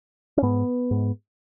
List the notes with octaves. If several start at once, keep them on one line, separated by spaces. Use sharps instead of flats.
C#4
G#2 B3
G#2